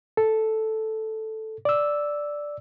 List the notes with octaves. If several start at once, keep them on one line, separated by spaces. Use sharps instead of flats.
A4
D5 E6